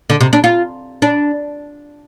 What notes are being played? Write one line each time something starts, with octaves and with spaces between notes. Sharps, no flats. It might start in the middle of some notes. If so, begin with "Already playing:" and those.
D3
C3
D4
F4
D4